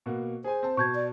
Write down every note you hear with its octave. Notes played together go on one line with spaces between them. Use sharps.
B2 A#3 F#5
G#4 C5 G#5
C4 A5
B2 A5 C#6 G6 G#6
D5